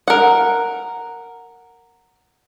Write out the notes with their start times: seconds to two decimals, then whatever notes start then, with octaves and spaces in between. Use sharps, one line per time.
0.08 A#4 F#5